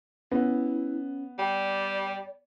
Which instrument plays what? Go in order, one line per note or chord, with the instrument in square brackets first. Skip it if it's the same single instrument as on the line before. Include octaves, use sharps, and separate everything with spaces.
[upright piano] B3 [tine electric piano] C#4 [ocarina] E4
[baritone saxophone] G3 [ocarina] D5 [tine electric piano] G5